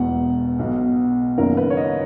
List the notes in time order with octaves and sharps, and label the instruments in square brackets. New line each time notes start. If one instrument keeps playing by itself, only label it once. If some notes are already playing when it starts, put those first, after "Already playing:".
Already playing: [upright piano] E1 E2 B2 F#5
B1 B2
F#1 F#2 D#3 A#4
B4
C#5
D#5